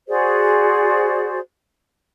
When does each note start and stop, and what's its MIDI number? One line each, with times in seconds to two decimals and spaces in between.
0.08 1.39 66
0.08 1.39 68
0.08 1.39 72
0.08 1.39 74